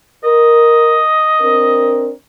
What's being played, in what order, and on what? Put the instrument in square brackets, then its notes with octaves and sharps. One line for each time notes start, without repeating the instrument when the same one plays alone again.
[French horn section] A#4 [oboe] D#5
[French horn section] C4 D4 A#4